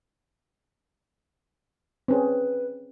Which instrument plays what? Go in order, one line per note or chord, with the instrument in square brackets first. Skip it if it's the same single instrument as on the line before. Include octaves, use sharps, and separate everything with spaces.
[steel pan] C4 C#4 G#4 [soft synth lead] B4